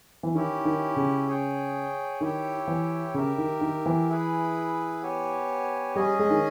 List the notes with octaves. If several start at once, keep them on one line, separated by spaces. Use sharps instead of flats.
E3
D#3 C#4 E4 G4
D#3
C#3
G#4 C#5 G5
D#3 E4 G4 C#5 E5 G5
E3
C#3 G4 A#4 E5
D#3
D#3
E3
E4 G#4 B4
B3 G4 C#5 G#5
G3 C#4 G#4 D#5 G#5
G#3
D#3